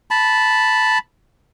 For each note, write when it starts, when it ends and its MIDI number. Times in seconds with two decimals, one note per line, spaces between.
0.11 0.98 81
0.11 0.98 83